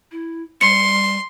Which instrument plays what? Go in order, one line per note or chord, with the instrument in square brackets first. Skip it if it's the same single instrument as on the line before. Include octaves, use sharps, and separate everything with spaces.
[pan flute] E4
[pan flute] G3 [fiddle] C6 [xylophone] C#7